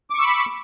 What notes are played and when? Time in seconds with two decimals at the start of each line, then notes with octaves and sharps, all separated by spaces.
0.10 D6
0.14 C#6
0.19 E6
0.23 B5